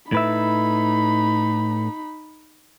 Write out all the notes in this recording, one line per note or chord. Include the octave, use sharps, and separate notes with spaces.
A2 D#4 B4 E5 B5